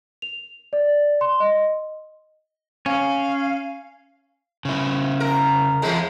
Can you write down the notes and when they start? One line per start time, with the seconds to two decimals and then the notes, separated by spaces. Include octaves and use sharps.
0.22 F7
0.73 D5
1.21 C6
1.40 D#5
2.86 C#4 F5
4.65 C#3 E4
5.20 A#4
5.82 E2 G#3